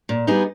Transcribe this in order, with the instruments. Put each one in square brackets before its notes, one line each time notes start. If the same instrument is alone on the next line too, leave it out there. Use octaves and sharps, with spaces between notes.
[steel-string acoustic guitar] A#2
G3 B3 D#4 G#4